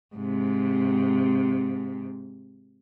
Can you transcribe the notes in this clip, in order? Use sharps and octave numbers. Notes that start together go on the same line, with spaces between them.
G#2 C3